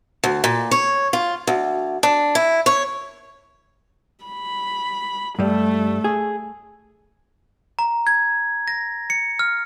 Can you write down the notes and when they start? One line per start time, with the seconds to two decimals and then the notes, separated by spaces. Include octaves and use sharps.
0.24 D2
0.44 A#2
0.71 C#5
1.13 F4
1.47 D2
2.03 D4
2.35 E4
2.66 C#5
4.25 B5
5.39 G2 G3 A3
6.04 G#4
7.79 A#5
8.07 G#6
8.68 A#6
9.10 C#7
9.39 F6